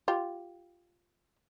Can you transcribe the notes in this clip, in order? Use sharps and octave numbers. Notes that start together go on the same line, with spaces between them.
F4 G4